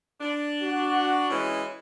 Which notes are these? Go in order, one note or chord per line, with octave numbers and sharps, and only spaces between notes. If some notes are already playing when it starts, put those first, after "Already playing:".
D4
F#4
E3 G#3 C#4